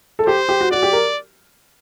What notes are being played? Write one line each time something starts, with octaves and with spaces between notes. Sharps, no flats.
A4
G4 C5
G4
F#4
F#4 D5
G4
A#4